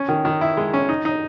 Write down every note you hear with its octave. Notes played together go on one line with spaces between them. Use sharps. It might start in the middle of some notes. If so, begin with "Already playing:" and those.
Already playing: C#4
D#3
D#3
E4
G#3
C#4
D#4
D#4